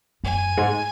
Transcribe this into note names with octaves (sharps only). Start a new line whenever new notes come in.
F#2 G#5
G#2